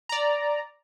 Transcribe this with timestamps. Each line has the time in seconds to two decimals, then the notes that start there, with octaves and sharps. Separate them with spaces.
0.09 D5 A#5